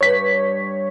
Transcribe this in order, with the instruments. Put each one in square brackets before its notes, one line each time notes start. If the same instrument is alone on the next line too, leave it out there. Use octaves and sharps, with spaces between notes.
[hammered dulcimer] G2 [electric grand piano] C#5 B6